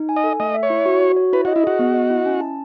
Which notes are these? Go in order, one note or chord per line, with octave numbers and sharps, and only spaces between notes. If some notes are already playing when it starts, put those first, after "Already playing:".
Already playing: D#4
G#5
D#5
A4
A3 D#5
E5
C#5
E4
F#4
F#4
C#5
E4 B4
F#4 D#5
E4
F#4 G#4
B3
D#5
E4
C#4
A5